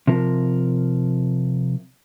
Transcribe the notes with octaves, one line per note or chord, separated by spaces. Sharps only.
C3 F3 A#4